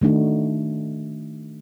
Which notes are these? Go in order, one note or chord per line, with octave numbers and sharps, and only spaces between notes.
D#3 A3 D4 D#4 F#4